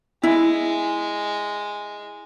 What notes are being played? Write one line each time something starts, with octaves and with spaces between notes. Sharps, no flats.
G#3 E4